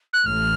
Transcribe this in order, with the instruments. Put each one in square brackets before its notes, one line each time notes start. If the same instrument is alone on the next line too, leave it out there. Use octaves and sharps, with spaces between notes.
[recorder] F#6
[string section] A1 A2 [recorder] F6